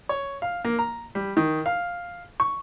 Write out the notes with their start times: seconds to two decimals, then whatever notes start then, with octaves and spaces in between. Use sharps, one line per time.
0.09 C#5
0.42 F5
0.64 A#3
0.79 A#5
1.15 G3
1.37 D#3
1.66 F5
2.40 C#6